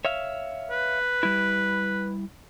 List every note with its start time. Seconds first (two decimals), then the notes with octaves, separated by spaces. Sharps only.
0.05 C#5 E5 F5
0.71 B4
1.23 G3 E4